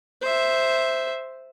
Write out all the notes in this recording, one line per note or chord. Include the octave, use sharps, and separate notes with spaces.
C5 E5